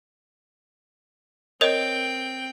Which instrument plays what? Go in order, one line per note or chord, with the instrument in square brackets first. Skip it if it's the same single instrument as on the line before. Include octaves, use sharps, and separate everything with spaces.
[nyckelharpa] C4 G5 [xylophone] A#4 C#5 D#5